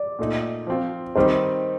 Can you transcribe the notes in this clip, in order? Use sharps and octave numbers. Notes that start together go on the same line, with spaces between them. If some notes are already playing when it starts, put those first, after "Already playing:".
Already playing: D5
A#2 A3 D#4
F3 C4 F4
D#3 G3 C4 D#4 C5